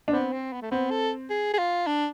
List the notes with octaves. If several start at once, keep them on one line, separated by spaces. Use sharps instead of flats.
D4
B3 C4
C4
B3
A3
B3 C4
A4
G#4
G#4
F4
D4